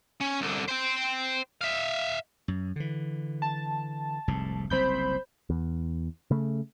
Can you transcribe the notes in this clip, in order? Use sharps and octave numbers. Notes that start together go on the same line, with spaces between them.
C#4
C2 D3
C5 G5
E5 F5
F#2
D3 E3
A5
F1 C2 G#2
F#1 C2 C4 C5 B5 G6
E2
C#3 A3